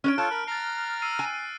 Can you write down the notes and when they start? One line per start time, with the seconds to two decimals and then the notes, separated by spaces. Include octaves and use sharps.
0.04 C#4 A#4 C#5 F6 D7
0.18 F4 A4 C#5 A5 F#6
0.31 A#4 B5
0.47 A#5 F6 A6 C7
1.02 E6 C7 D#7
1.19 G#5